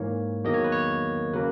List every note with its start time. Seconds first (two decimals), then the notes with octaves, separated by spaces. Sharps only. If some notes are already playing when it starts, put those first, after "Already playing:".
Already playing: G#2 E3 A#3 C#5
0.45 E2 D#3 F#3 A#3 D#5
0.54 C#5
0.64 B4
0.72 C#5
1.33 C#3 F#3 A#3 B4